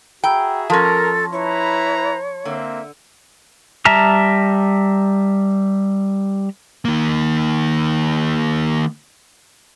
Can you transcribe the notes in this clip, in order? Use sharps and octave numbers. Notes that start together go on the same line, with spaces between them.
F#4 G#4 E5 G5 A#5 B5 E6
F3 C#4 A4 A#4 A5 C6 A#6
E4 B4 C#5 A#5
D3 A#3 C4 E5
G3 E5 A5 A#5 F6
D#3 A#3